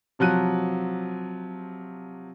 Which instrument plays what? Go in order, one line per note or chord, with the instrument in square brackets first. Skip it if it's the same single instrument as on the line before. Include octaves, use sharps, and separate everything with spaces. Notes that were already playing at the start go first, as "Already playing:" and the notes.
[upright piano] C3 F3 F#3 F#6 D#7